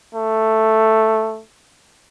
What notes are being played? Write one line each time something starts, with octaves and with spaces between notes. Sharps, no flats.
A3